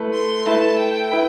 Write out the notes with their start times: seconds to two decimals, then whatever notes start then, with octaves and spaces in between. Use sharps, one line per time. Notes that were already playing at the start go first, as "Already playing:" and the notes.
Already playing: A3 E4 B4
0.13 C6
0.46 A3 E4 B4 A5
0.78 G5
1.11 E4 B4